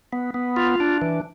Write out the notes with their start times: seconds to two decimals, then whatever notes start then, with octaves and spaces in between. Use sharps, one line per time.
0.12 B3
0.34 B3
0.56 F4
0.80 D4
1.02 E3